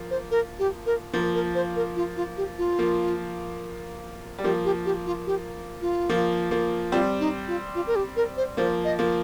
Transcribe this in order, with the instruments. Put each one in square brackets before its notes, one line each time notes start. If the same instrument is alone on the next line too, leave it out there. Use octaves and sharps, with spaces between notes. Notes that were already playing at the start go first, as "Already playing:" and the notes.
Already playing: [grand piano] F3 A#3
[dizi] C5
A#4
G4
A#4
[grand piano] F3 A#3 [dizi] A#4
[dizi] A#4
C5
A#4
F4
F4
G4
F4
[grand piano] F3 A#3
G3
[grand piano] F3 A#3 [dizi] G4
[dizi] G4
G4
F4
G4
F4
[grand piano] F3 A#3
F3 A#3
[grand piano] G3 C4 [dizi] F4
[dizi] D#4
F4
F4
A#4
G4
A#4
C5
[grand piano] F3 A#3 [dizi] C5
[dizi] D#5
[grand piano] F3 A#3